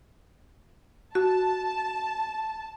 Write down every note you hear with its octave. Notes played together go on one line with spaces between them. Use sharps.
F#4 A5